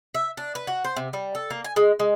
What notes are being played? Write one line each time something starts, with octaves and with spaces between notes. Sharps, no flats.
E5
D4
B4
F#4
C5
C3
G3
A4
A#3
G#5
G#3
G#3